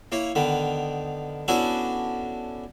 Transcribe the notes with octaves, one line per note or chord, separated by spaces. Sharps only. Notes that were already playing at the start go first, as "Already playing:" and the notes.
A#3 E4 C#5
D3 D#3 B3
B3 C#4 D4 E4 F#4 A4